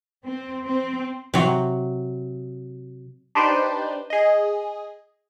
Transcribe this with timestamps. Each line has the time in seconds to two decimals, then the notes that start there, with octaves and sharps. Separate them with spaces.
0.24 C4
0.64 C4
1.34 C3 F#3
3.35 D4 D#4 G4 B4 C5 D5
4.10 G#4 D#5